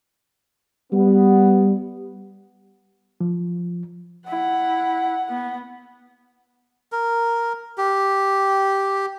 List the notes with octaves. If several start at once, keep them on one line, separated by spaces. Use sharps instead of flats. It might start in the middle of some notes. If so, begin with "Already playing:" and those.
G3 B3
F3
E4 F#5
B3
A#4
G4